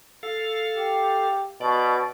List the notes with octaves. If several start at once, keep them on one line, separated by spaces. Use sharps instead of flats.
A4 F5
G4
B2 D5